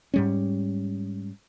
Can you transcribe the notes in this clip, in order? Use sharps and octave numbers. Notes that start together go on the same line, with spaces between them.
G#2 G3 C#4